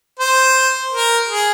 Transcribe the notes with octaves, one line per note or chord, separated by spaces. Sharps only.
C5
A#4
G#4